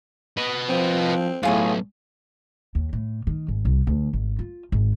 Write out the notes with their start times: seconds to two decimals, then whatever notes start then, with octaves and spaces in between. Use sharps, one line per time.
0.37 B4 D#5
0.69 F3 C4
1.43 B1 F#2 A2 A3 F4 G#4 C#5
2.75 D#2
2.93 A2
3.27 D#3
3.48 G#1
3.65 C2
3.87 D2
4.13 G#1
4.39 F4
4.72 G#1